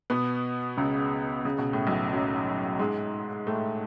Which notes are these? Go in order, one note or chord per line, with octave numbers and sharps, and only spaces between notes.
B2 B3
C#2 C#3
C#3
B2
A2
B1 B2
F#2 F#3
G#2 G#3
A2 A3